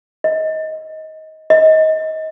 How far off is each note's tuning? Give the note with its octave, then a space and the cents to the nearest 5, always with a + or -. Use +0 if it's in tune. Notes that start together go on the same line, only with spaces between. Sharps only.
D#5 +20
D#5 +25